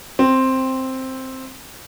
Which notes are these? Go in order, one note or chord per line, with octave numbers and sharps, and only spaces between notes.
C4